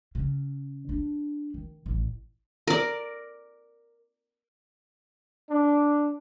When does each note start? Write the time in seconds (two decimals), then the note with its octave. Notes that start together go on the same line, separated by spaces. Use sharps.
0.15 C#3
0.89 D4
1.54 D#3
1.86 A1
2.67 A#4 D5
5.50 D4